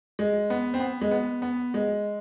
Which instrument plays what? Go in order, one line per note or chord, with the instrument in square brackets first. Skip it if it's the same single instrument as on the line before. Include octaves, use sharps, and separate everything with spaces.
[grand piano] G#3
B3
C4
B3
G#3
B3
B3
G#3